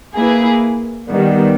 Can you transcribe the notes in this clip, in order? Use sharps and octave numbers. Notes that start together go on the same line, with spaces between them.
A#3 E4 G#4 B4
D#3 G3 B3